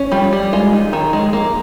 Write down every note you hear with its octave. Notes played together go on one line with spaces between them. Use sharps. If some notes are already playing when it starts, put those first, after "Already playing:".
Already playing: C#4
G3 F4
G3
G#3 F4
D#4
D#3
G#3
A#3